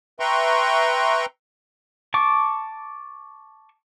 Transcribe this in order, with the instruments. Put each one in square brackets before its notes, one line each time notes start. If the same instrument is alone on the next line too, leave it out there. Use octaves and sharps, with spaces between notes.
[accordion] B4 E5 G5 A#5 C6 C#6
[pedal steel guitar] A5 C#6 D6